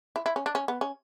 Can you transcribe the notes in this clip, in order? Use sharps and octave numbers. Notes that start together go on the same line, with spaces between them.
E4
E4
C#4
D4
C#4
B3
C#4